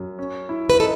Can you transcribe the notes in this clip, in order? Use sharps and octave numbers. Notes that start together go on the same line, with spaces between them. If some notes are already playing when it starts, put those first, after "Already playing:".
Already playing: F#2
C#4
E4
B4
D#4 A4